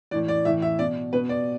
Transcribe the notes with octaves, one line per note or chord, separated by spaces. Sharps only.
A2 E3 D5
D5
A2 E3 E5
E5
B2 D5
B2 B4
D5